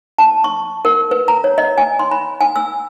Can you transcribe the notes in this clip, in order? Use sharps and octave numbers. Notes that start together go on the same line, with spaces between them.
A5
C#6
A#4
B4
A#5
C#5
D#5
G#5
C6
B5
G#5
E6